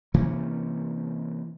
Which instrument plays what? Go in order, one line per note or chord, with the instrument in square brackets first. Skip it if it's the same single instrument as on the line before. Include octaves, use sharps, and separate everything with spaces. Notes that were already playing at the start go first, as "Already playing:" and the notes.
[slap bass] C3 E3 A#3 C#4